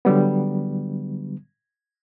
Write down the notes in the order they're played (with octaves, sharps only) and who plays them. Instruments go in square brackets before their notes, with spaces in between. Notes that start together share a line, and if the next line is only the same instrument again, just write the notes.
[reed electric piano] D3 F#3 G3 B3